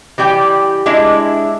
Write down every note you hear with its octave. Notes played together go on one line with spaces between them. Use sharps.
E3 G3 D5 G5
G#3 D4 E4 D#5